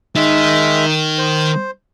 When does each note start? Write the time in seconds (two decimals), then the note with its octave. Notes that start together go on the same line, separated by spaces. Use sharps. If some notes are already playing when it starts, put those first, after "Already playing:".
0.16 D#3 G#3 E5
1.18 C5